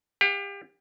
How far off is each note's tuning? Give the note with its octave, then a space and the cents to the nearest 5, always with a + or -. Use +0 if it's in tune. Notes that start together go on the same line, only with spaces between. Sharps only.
G4 +30 F#5 -40